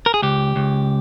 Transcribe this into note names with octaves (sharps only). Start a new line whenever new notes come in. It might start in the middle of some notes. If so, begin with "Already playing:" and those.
A#4
G#4
C#2 G4
C#2